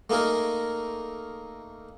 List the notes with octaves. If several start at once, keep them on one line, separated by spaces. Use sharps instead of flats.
A3 A#3 D#4 G#4 A#4